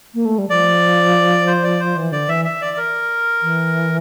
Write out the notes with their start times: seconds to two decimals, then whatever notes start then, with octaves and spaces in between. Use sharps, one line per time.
0.14 A#3
0.25 A3
0.38 G3
0.50 F3 D5
1.47 C5
1.64 D5
1.80 C5
1.96 E3
2.12 D3 D5
2.29 E3 E5
2.45 E5
2.61 D5
2.77 A#4
3.42 E3